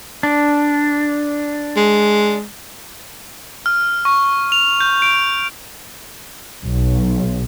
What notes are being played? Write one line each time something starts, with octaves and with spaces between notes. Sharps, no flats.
D4
G#3
F6
C#6
F7
G6
D7
B1